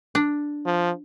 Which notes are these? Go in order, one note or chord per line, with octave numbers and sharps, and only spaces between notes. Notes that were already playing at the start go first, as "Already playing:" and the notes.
D4
F3